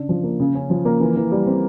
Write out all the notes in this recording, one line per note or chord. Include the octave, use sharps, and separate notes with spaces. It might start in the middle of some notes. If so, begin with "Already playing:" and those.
Already playing: C#3 D4
F3
A#3
C#3
C#4
F3
A#3
E3
E3
G3
C4